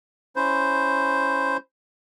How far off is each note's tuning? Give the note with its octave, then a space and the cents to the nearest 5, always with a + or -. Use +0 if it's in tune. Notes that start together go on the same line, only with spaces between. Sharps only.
C#4 +0 E4 +0 C5 +0